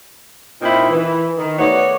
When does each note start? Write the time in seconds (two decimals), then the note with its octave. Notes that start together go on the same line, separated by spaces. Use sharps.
0.61 A#2 A#3 C4 D#4 E4
0.89 E3
1.38 D#3
1.58 A3 B3 F#4 C#5 D5